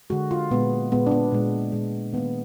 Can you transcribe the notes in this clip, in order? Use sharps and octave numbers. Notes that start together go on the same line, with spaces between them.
D3 G#3 F#4
F4
A#2 G#3 B3
A#2 G#3 B3
D4
B3
A#2 G#3
A#2 G#3
D#3 B3
A#3